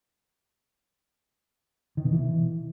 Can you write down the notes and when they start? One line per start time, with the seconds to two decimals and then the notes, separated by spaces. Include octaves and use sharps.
1.97 D#3
2.05 B2
2.12 E3